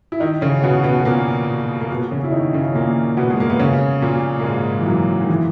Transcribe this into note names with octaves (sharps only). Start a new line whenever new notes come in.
E4
D#3 D#4
C#3 C#4
B2 B3
B2 B3
B3
A#2 A#3
A#3
B2 B3
C#3 C#4
E4
D#3 D#4
C#3 C#4
A#2 A#3
B2 B3
G#3
A#3
B3
C#3 C#4
A#2 A#3
A#3
G#2 G#3
E3
F#2 F#3
D#3
E3